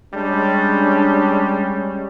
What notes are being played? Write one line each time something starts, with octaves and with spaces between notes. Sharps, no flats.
G3 G#3 C#4 D4